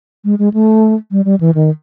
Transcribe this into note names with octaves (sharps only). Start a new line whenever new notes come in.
G#3
G#3
A3
G3
G3
E3
D#3